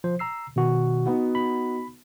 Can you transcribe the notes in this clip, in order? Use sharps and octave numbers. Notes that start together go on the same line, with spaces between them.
F3 C5
A#5 E6 C7
B2 D#3 F#4
B3 D#4 F#4
B5